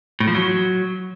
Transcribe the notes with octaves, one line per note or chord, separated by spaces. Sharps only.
A2
F3
F#3